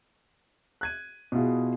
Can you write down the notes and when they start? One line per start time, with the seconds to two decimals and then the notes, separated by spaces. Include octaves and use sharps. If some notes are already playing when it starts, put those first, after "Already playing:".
0.81 F#6 G#6 D#7
1.32 B2 B3 E4 F4 G#4